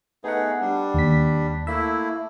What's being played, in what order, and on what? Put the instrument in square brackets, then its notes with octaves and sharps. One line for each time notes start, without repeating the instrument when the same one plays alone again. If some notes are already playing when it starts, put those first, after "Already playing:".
[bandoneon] A3 D#4 G#4 [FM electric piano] B3 F#5
[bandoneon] G3 D4
[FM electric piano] D#2 B6
[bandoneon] A3 A#3 E4 [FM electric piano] E5